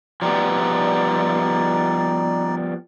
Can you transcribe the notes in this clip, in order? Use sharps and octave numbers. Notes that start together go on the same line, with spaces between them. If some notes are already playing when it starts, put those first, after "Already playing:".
F3 G3 B3 D#4 D5